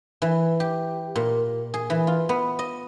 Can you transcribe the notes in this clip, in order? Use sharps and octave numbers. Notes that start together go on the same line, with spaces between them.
E3
G4
A#2
G#4
E3
F4
B3
D#5